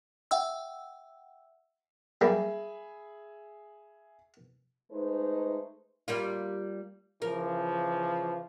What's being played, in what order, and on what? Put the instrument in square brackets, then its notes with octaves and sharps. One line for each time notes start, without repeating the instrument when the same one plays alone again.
[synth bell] E5 F#5 G5 E6
[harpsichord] G3 A#3 [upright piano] G#4 E5 B5
[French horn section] G#3 A3 D#4 B4 C5
[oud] G3 A#3 F4
[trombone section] C#3 E3 F3 [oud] A#4